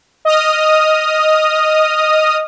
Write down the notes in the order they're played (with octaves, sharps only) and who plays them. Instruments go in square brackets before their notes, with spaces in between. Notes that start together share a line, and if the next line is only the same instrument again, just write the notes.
[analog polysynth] D#5 D#6 F6